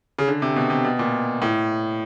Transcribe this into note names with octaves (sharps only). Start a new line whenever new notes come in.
C#3
D3
C3
B2
C3
B2
A#2
A2